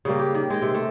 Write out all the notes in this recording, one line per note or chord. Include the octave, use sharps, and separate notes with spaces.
C#3 G3 A#3
G4
D#3
G#3 G5
C3
A3